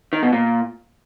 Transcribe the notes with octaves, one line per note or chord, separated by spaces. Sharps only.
D#3
B2
A#2